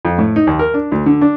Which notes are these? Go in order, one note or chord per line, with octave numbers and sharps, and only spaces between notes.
F2
A2
D#4
D#2
A#4
D4
D2
D3
D4